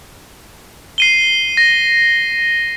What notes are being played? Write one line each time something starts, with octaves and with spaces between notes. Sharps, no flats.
C7 D#7 G7
A#6